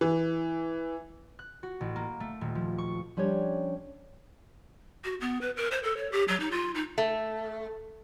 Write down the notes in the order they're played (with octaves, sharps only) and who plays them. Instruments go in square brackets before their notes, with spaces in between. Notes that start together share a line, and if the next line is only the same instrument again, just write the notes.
[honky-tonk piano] E3
[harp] F#6
F#4
A1
A#3
A3
D#1
F3
C#6
[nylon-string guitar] F3 G3 C#4 D4 C#5
[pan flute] F#4
B3
B4
A#4
C5
A4
C#5
G4
F#3
D#4
F4
D#4
[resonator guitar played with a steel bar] A3